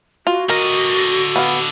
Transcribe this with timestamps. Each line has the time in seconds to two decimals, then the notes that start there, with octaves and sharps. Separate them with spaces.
0.27 F4 F#4
0.50 D3 A#4 D#5
1.36 B3 F5